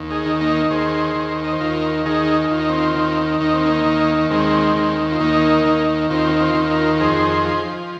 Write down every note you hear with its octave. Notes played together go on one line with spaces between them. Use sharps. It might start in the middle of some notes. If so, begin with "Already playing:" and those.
Already playing: D#2
D#4 G#4
D#3
A#3 D#4
D#2 G#4 C5
D#3
D#5
C5
D#2 F4 A#4
D#3 D#4 G#4
D#2 F4
D#4
C4 F4
D#3
D#2 D#4
C4
A#3 D#4
D#3
D#2 G#3 C4
D#3
F4
D#2 A#3 D#4
D#3
D#2 C4 F4
C4 F4
D#3
F4 A#4
F2 G#4 C5
F3